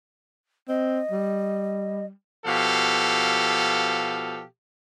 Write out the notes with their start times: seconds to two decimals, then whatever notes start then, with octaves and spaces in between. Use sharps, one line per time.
0.69 C4 D#5
1.11 G3
2.46 B2 F3 G4 A4 F5